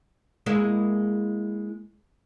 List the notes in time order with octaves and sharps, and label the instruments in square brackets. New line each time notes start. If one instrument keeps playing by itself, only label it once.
[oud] G#3 A#3 E4